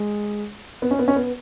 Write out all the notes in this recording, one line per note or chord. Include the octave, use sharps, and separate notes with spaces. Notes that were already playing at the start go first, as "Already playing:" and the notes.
Already playing: G#3
B3
C#4
B3
C#4
B3